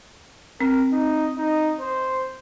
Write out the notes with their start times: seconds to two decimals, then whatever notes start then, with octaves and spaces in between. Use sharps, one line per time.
0.61 C4 A#4
0.92 D#4
1.38 D#4
1.80 C5